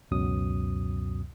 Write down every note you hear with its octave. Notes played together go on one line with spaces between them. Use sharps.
C#2 F#2 B2 F#3 D#6